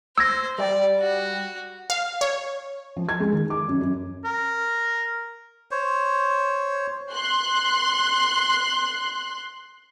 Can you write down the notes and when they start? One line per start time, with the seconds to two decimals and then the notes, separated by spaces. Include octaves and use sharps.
0.18 C5 E6 G#6 A#6
0.58 G3 D5
1.00 F#4
1.90 F5
2.21 C#5
2.97 F3
3.09 G#6
3.20 G#3
3.33 D#3
3.50 D6
3.68 F#2
3.81 F#2
4.24 A#4
5.71 C5 C#5
7.11 C6 F#6